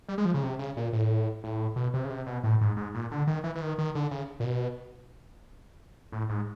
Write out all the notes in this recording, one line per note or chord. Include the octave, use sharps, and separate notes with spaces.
G3
G#3
F3
C#3
C3
C#3
A#2
A2
A2
B2
C3
C#3
C3
B2
A2
G#2
G#2
A#2
D3
D#3
E3
E3
D#3
D#3
D3
C#3
A#2
B2
A2
G#2